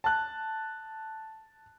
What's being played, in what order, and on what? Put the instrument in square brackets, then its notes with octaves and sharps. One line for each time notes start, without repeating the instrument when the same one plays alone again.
[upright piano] A5 F#6